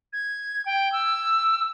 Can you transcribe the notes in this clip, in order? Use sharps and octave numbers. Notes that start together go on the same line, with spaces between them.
G#6
G5
E6